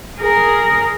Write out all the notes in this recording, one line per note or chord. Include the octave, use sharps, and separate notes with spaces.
G#4 A#4